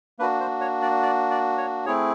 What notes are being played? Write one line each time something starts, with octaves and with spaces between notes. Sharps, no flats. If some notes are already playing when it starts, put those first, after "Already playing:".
A#3 D4 F#4 B4
C5
C#5
D5
D5
D5
C#5
A3 C4 E4 G#4 C#5